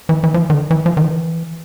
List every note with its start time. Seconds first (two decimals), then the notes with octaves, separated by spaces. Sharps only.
0.09 E3
0.24 E3
0.34 F3
0.39 E3
0.50 D#3
0.54 D3
0.71 E3
0.86 F3
0.97 D#3
1.02 E3